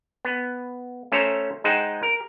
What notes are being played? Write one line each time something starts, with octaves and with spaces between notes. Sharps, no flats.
B3
A3 C#4 A4 C5 C#5 A#5
G#3 D#4 C5 F#5 G5
A#4